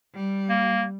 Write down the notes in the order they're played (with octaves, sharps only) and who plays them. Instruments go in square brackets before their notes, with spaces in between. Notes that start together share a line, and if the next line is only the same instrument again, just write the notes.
[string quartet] G3
[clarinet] A#3